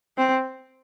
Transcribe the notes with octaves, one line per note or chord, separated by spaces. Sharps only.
C4